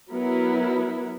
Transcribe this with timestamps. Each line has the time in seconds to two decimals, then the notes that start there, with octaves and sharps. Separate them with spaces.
0.11 F#3 B3 E4 A#4